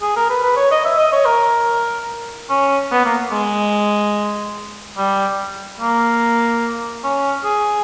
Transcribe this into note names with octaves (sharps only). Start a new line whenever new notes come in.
G#4
A#4
B4
B4
C#5
D#5
E5
D#5
C#5
A#4
C#4
B3
A#3
G#3
G3
A#3
C#4
G#4